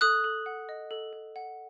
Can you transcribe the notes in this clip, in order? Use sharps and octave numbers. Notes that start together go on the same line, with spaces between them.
A4 D#6 F#6
A4
F#5
D#5
A4
A4
F#5